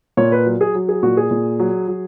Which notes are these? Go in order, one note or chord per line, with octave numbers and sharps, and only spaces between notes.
A#2 C#5
B4
F#3
G#4
F#3
G#4
A#2 F#4
G#4
A#2
F#3
F#3